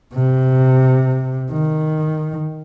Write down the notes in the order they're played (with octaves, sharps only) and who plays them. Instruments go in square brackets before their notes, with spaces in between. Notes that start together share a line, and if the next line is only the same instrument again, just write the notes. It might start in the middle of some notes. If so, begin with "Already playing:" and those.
[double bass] C3
D#3